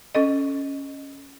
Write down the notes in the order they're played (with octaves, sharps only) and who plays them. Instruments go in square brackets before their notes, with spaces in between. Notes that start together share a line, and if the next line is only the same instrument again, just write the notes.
[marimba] C#4 A4 D#5